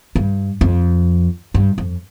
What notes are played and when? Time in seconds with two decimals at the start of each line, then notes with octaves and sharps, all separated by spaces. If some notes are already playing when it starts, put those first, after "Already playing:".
0.15 G2
0.61 F2
1.54 G2
1.78 F2